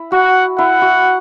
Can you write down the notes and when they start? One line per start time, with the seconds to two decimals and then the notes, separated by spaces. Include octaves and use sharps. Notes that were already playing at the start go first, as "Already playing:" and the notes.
Already playing: E4
0.12 F#4 F#5
0.58 E4 F#5
0.82 F#4